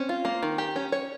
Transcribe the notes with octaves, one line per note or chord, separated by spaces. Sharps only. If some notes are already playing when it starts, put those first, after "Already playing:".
Already playing: C4 C#4
F4
A#3
D#3
G4
C#4
C#5